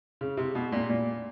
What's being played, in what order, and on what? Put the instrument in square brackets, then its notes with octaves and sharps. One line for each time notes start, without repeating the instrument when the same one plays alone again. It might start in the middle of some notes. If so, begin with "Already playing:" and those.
[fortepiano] C#3
C3
B2
A#2
A#2